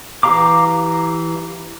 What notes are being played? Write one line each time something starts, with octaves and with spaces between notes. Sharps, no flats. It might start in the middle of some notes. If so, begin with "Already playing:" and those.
E3 G4 F5 A#5 D6